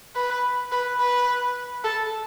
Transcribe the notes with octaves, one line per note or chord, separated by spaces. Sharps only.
B4
B4
B4
A4